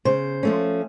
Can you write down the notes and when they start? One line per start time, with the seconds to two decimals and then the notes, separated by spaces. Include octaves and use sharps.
0.05 C#3 C5
0.43 F3 A3 C#4